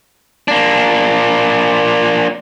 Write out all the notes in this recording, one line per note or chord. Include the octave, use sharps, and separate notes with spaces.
A#3 D4